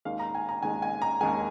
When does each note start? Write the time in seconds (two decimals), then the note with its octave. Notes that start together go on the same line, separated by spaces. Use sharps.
0.05 D#2 D#3 G#3 F5
0.19 A#5
0.35 G#5
0.49 A#5
0.62 D#2 D#3 G#3 G#5
0.82 G#5
1.02 A#5
1.21 D#2 D#3 G#3 G#5